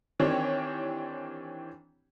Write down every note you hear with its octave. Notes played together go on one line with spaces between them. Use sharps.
D#3 E3 C4 D4 G4 C#5